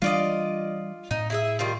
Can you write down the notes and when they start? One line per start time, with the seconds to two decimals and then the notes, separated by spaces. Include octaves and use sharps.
0.02 E3 G3 D4 F4 D5 D#5
1.11 A2 D#4
1.30 E4 G#4 E5
1.59 D#3 G3 F4